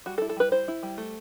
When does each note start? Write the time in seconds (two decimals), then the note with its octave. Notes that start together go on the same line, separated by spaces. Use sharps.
0.06 G3 F#4
0.18 A4
0.22 E4
0.29 A4
0.37 G3 B4
0.52 E4 C5
0.68 E4
0.83 G3
0.98 A3